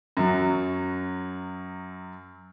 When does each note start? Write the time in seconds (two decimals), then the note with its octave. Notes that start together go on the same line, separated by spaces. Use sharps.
0.17 F#2 F#3